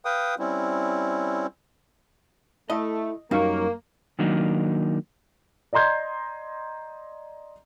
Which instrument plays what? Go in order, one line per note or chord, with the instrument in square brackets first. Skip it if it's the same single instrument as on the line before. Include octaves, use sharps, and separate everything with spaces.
[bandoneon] B4 F5 G5 D#6
G3 C4 C#4 E4
[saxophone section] A3 [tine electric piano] E4 [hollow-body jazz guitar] D#5
[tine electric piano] F#2 F#3 C#6 [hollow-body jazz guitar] G3 C#4 D#4 [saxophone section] A#3
[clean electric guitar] D#3 F#3 A#3 D4 D#4
[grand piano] D5 D#5 A#5 C6 G6 G#6